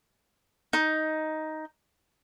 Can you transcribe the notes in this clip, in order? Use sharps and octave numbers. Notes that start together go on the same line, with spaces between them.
D#4